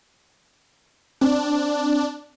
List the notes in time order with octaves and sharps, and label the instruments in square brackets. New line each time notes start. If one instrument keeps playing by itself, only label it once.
[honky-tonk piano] C4 [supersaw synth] D4